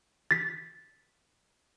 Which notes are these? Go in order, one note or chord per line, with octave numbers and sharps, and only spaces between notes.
A6 B6